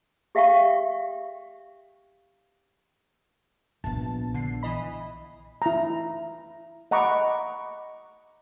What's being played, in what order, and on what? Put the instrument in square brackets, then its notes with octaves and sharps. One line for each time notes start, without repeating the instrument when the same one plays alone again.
[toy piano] G4 E5 F5 G5 C#6
[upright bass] A#1 B3 [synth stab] A5
[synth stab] D3 C7
E3 D#5 B5
[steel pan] E4 A#5
D#5 F#5 A#5 B5 C#6 D6